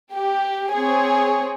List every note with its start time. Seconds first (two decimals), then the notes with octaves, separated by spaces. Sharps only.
0.13 G4
0.71 C4 G#4 C#5